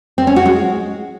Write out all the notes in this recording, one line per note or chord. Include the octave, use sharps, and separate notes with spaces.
C4
C#4
F#4
G#3